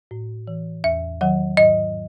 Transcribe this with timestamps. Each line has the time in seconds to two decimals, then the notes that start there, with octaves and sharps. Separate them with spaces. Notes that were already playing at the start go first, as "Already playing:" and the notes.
0.11 A2
0.47 E3
0.84 E2 E5
1.21 D#3 F#3 F#5
1.57 G#2 D#5